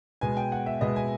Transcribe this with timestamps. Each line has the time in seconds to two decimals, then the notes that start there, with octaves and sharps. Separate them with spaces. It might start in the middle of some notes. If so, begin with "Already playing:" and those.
0.21 B2 G#3 B3 G#5
0.37 G5
0.52 F#5
0.66 E5
0.81 B2 G#3 B3 D#5
0.96 G#5